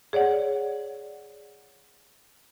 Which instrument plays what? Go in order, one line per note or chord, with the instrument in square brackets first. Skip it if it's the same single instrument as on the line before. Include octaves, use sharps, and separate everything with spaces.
[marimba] G#4 C#5 D5 F#5